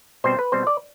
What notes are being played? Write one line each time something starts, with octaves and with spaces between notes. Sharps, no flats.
B2 G3 C4 C5
B4
B2 G3 C4 C5
D5